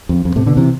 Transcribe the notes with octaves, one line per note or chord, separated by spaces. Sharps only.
F2
F2
A2 C3
B2 D3
C3 E3